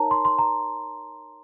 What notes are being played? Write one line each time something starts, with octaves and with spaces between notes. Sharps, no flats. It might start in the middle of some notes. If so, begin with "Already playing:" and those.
Already playing: D#4 A#4 C#5 A5 A#5
C6
C6
A#5